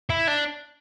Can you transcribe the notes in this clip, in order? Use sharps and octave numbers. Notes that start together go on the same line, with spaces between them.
E4
D4